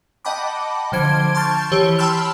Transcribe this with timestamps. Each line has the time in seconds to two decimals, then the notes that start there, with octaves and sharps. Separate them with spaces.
0.25 D#5 F#5 G5 A5 B5 D6
0.92 D3 F3 C5 G#6 D7
1.35 A5 C6 C#6 F6 G6 A6
1.72 E3 G4 C#5 G7
1.98 G5 A5 B5 C6 E6 F6